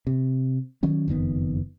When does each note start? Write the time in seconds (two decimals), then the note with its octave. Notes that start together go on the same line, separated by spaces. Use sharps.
0.07 C3
0.83 D#3 F#3 C#4
1.08 F#1 F2 D#3 B3